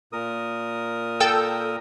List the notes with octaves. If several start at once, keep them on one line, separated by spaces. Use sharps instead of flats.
A#2 A#4 D#6
A4 G5 E6